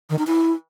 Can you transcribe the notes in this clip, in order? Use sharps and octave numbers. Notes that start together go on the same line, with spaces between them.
D#3
D#4
E4